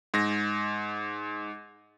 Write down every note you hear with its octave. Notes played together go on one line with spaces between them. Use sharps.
G#2 A#6